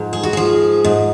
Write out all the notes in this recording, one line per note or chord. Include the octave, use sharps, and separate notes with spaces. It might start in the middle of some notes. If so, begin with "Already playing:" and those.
Already playing: G#2 F3
G#4
F#4
F3 G#4
G#2